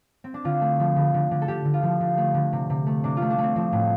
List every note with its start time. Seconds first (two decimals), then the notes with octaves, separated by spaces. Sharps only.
0.24 C4
0.34 D4
0.45 D3 F4
0.61 A3
0.80 F3
0.96 D3
1.14 D3
1.31 D3
1.42 A4
1.48 D3 G4
1.65 D3
1.74 F4
1.83 F3
2.00 D3
2.17 A3
2.34 D3
2.53 C3
2.70 C3
2.86 A3
3.04 C3 D4
3.17 F4
3.22 A3
3.30 D4
3.38 A3
3.43 C4
3.56 F3 C4
3.72 A2